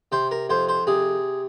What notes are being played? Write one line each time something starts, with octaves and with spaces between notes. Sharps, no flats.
C3 C5
A#4
F2 C5
C5
C3 G#4